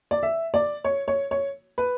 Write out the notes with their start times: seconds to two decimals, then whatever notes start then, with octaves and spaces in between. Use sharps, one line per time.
0.11 D5
0.23 E5
0.54 D5
0.84 C#5
1.08 C#5
1.31 C#5
1.78 B4